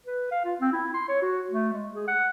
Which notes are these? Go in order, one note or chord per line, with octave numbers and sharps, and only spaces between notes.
B4
F5
F4
C4
E4
C6
C#5
F#4
A3
G#3
G#4
F#5